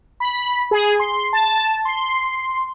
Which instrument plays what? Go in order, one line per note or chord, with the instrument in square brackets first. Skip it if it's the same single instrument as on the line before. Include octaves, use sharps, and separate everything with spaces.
[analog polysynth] B5
G#4
C6
A5
C6